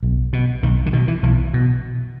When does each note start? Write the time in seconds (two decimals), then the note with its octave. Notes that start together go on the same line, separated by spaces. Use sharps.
0.03 B1
0.33 B2
0.63 B1 D#3
0.86 D3
0.93 B2 D#3
1.08 E3
1.23 B1 E3
1.54 B2